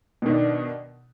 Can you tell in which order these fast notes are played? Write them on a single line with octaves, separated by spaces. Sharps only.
B2 D#3 D4